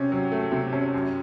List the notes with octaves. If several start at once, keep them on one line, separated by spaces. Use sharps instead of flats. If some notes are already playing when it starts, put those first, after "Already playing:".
Already playing: C3 C#4
F#3
A3
C3
C#4
F#2